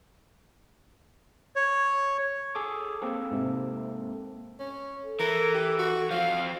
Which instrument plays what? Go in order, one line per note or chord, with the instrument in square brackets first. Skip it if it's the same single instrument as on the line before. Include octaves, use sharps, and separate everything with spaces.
[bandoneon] C#5
[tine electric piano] G#4 A4 D6
A#3 C4 A4
[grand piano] G#2 C3
[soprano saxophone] C#4
[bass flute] A4
[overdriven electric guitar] E3 [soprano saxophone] A#4
[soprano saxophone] G4
F#4
[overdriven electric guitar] F3 C4 [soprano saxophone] F5